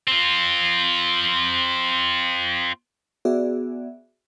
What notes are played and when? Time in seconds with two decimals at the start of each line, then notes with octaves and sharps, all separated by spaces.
0.08 C4 F4
3.25 B3 F#4 G#4 D5 E5